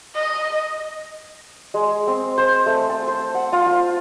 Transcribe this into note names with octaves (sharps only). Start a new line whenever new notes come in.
D#5
G#3
C4
C5
A3
A5
C5
F#5
F4
F4